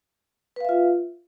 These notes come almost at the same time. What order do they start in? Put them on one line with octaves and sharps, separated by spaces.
B4 F5 E5 F4